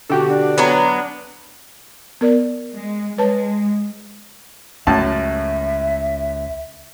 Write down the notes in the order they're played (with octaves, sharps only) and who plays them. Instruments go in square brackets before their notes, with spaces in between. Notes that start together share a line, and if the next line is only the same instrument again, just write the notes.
[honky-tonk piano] B2 D3 [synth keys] F#4 G4 A4
[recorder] D4
[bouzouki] F#3 B3
[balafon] B3 A#4 D5
[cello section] G#3
[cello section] G#3 [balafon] B4 C#5 A5
[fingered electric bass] C#2 [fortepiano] F#2 A2 A5 [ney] E5